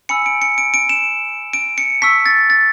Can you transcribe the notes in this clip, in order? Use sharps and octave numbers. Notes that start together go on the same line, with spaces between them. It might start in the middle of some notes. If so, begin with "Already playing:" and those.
G#5 B5 E6 C#7
D7
C#7
D7
D7
E7
D7
C#7
A5 C#6 E6 B6
A6
A6